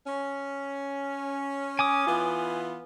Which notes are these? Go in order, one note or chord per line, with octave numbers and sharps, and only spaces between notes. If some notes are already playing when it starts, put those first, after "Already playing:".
C#4
G#5 D6 D#6
E3 B3 F4